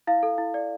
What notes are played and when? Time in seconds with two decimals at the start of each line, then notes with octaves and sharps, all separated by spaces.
0.07 E4 F5
0.23 A4
0.38 E4
0.54 D5